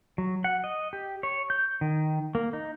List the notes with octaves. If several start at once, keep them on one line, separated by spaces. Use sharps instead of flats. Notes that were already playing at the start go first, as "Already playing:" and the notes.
F#3
F#5
D#5
G4
C#5
G6
D#3
A#3
D#4